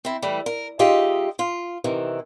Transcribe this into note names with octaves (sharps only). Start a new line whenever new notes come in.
C4 E4
E3 G3 A3
A#4
G#3 D#4 F4 G4 D#5 E5
F4
C3 D#3 E3